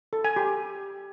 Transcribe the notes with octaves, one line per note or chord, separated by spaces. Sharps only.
A4
G#5
G4